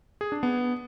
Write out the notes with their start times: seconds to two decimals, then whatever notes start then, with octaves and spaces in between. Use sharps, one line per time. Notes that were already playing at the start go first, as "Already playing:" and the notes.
0.21 G#4
0.32 D4
0.43 B3